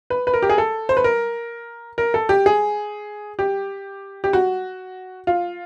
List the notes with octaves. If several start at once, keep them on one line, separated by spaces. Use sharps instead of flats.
B4
B4
A#4
G4
G#4
A4
C5
B4
A#4
A#4
A4
G4
G#4
G4
G4
F#4
F4